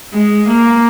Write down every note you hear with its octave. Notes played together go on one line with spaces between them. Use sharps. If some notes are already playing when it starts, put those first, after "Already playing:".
G#3
A#3